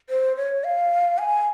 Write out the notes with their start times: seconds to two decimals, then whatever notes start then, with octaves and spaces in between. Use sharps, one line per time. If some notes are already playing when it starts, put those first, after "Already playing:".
0.10 C5
0.36 C#5
0.64 F5
1.18 G#5